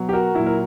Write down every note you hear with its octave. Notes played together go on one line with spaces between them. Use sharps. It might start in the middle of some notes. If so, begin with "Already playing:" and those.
Already playing: B2 F#3
G4
F#4 A#4
A#2 F#3 E4
A#4